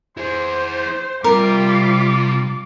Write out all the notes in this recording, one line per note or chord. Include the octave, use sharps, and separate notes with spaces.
E4 G#4 C5
C3 G3 F4 A#4 D6